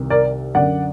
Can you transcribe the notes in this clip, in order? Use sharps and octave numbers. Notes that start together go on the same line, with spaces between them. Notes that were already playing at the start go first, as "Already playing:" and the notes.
Already playing: C2 C3 D#3
A#4 D5
F#2 D3 D5 F#5